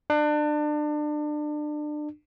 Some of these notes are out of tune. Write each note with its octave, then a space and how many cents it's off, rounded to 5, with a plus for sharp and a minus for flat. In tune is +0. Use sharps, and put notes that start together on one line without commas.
D4 +30